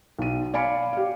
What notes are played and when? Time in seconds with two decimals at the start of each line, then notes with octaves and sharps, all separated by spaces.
0.19 B1 D#7
0.54 D5 F5 G#5 B5 C#7 D7
0.93 G4 F5